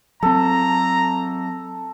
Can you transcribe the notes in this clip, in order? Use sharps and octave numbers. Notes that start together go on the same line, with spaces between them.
F#3 C4 A4 A#5